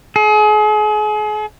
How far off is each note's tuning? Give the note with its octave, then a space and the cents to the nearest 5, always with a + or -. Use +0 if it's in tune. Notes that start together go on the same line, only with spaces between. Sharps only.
G#4 +35